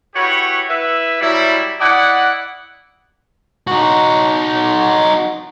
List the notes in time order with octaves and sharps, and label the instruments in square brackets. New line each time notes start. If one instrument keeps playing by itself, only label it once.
[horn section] E4 F#4 G4 B4 C#5
E4 B4 E5
F#3 G3 E4
E4 D5 D#5 F#5
[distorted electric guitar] D#4 F#4